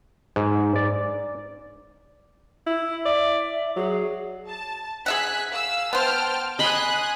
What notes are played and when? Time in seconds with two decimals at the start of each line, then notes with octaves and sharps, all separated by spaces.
0.36 G#2
0.76 D5
2.67 E4
3.06 D5 E5
3.76 F#3 G#4
4.46 A5
5.06 G#4 E5 F#5 G#5 F#6 B6
5.52 F5 E6
5.93 B3 C5 G5 A5 F6
6.59 D#5 G#5 B5 C6 D#6 F#6